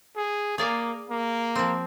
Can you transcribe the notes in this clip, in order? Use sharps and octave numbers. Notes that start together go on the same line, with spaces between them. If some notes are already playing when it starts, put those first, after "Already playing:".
G#4
A#3 G#4 D5 F5
A#3
F3 C4